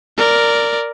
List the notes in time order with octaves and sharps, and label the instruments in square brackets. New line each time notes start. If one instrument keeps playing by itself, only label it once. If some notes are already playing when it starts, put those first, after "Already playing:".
[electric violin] A#4 D5